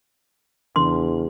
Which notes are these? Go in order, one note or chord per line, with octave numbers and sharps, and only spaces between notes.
E2 C#3 E3 D4 C6